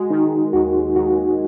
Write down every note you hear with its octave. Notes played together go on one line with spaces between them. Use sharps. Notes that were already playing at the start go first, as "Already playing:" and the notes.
Already playing: G#3 F#4
D#3 D#4
D#2 F#4
D#2 F#4